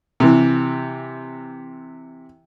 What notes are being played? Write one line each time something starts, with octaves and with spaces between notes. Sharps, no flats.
C3 E3